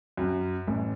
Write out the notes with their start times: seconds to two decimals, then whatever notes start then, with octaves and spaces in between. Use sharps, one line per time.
0.17 F#2
0.67 A1